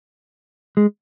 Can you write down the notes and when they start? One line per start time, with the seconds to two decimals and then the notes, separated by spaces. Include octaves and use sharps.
0.77 G#3